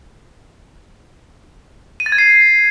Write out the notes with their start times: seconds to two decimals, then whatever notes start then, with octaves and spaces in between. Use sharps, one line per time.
2.00 D#7
2.06 A6
2.12 G#6
2.18 C7